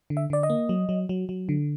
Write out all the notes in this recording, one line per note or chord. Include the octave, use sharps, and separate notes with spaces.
D3
E5
D3 D5
D#5
A#3
F#3
F#3
F#3
F#3
D3